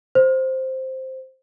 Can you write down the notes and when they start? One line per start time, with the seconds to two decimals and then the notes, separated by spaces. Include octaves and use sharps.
0.15 C5